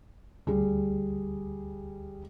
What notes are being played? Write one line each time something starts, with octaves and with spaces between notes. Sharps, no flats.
D2 G3 G#4